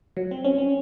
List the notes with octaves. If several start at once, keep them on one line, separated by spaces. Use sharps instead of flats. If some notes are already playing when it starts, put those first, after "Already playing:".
F#3
C4
C#4
C#4